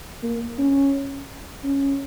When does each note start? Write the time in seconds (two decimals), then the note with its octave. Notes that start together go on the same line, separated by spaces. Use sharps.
0.23 A#3
0.58 C#4
1.63 C#4